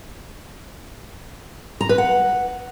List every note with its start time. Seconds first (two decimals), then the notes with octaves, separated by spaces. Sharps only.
1.81 A#5
1.89 B4
1.98 F#5